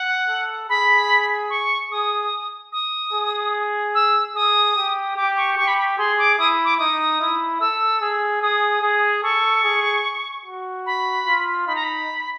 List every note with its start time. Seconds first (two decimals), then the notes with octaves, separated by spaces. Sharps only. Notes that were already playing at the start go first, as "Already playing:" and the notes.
Already playing: F#5
0.28 A4
0.69 G#4 B5
1.50 C#6
1.91 G#4 D#6
2.73 D#6
3.13 G#4
3.95 E6
4.35 G#4 D#6
4.76 G4
5.17 G4 D6
5.37 C#6
5.58 G4 C#6
5.68 B5
5.78 B5
5.98 G#4 C6
6.18 D6
6.39 E4 D#6
6.65 D6
6.79 D#4 D#6
7.20 E4
7.61 A4 E6
8.01 G#4
8.42 G#4 D#6
8.82 G#4
9.23 A4 C#6
9.63 G#4
10.45 F#4
10.86 B5
11.26 F4
11.67 D#4 B5
11.75 A#5
11.84 B5